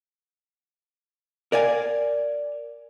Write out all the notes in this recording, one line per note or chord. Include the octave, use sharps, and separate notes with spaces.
A#4 D5 F5 G#5